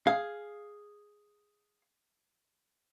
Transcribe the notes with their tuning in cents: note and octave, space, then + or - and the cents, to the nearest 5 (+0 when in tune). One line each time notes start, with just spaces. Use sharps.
G#4 +0 F5 +0